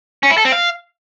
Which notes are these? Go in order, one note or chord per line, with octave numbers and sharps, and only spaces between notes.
C#4
E4
A4
C4
F5